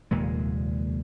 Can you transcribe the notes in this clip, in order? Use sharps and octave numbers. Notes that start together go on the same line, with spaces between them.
F1 D#2 A#2 G#3